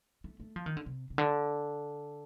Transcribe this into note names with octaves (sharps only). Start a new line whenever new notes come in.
A3
A3
F3
D#3
D3
C3
C3
D3